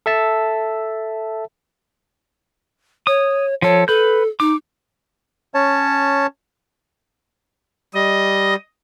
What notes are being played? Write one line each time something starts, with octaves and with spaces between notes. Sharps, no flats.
A4 E5 A5
C#5 D#6
F3 A4 C#5
A4 B4 G6
D#4 D6
C#4 C#5 A5
G3 D#5